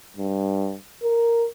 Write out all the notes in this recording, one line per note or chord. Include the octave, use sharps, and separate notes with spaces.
G2
A#4